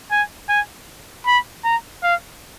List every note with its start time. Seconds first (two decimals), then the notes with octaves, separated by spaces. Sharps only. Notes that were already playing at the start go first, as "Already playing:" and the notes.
0.11 G#5
0.49 G#5
1.26 B5
1.65 A#5
2.03 F5